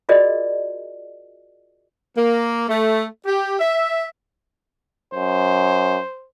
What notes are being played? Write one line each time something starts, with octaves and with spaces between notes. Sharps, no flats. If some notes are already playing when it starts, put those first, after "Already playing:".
F4 F#4 G#4 A#4 D5 D#5
A#3
A3
G4
E5
F#2 C5